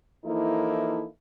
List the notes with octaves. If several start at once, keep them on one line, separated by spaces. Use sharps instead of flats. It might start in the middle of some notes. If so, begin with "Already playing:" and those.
E3 F3 A#3 D#4 E4 A4